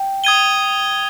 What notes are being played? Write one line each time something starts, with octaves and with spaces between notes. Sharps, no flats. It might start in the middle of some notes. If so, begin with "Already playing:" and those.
Already playing: G5
D#6 G#6 D#7 G7